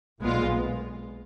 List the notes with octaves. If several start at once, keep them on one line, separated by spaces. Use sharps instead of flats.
B1 A#2 G#3 B3 F4